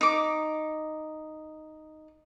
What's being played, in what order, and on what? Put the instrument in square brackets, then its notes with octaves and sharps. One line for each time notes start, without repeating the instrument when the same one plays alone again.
[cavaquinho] D#4 D6